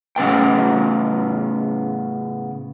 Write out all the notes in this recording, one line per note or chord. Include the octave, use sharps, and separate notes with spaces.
A2 C#3 B3 G5